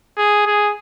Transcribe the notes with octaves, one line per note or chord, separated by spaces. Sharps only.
G#4
G#4